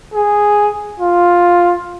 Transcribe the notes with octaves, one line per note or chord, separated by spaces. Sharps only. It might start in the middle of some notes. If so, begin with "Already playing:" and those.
G#4
F4